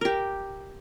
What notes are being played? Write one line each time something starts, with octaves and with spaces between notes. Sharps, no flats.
G4 A#4